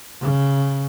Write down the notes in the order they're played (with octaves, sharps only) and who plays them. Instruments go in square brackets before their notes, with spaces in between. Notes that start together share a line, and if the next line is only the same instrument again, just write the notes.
[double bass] C#3